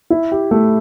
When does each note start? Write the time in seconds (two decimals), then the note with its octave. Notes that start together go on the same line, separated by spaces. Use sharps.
0.10 E4
0.32 G4
0.51 A3